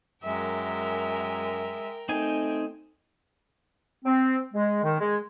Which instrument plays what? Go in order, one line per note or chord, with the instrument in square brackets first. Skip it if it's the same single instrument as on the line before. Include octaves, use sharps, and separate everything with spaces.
[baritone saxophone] F#2 [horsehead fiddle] G#3 E5 [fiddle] A#4 G5
[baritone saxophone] A3 [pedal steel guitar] C4 D#4 G#5 [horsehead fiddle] G5
[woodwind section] C4
G#3
D#3
G#3